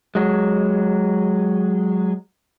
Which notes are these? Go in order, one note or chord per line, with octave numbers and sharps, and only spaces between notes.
F#3 G#3